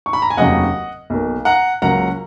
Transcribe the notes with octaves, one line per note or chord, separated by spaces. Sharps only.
C#6
B5
A#5
G#5
F1 D#2 C#3 F#3 D#5 F#5
B1 B2 A#3
F#5 A#5
C#2 C#3 F#3 A#3 F#5 A#5